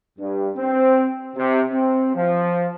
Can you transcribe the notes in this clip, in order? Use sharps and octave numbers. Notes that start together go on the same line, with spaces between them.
G2
C4
C3
C4
F3